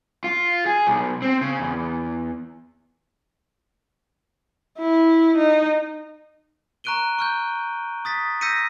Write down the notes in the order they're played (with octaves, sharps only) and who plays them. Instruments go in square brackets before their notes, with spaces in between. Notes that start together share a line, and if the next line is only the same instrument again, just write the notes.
[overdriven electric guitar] F4
G#4
B1
C4
C#3
E2
[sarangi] E4
D#4
[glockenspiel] A#5 C#6 F#6 D7 D#7 G7
C#6 F6 G6
D#6 A6 B6
E6 G6 A#6 B6 C#7 D#7